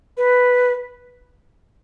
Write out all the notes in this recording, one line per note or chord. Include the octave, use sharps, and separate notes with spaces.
B4